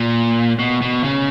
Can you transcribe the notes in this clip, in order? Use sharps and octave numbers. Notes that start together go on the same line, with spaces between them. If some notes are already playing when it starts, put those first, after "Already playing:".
Already playing: A#2
B2
B2
C#3